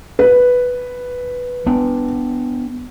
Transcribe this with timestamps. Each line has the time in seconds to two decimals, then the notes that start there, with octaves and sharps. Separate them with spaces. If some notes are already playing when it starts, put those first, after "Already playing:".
0.19 B4
1.66 B3 D4